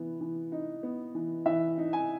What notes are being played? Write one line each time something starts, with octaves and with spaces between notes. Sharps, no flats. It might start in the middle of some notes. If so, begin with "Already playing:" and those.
Already playing: E3 B3
E3
D#4
B3
E3
E3 E5
D#4
G#5